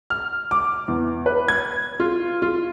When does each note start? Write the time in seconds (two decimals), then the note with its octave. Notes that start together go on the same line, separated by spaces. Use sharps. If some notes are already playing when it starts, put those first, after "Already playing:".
0.10 F6
0.51 D6
0.88 E2
1.26 B4
1.48 G#6
2.00 F4
2.42 F4